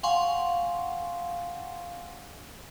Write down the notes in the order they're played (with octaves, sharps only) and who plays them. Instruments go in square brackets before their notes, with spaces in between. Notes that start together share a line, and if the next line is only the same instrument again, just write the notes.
[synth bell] F5 F#5 G#5 C6 C#6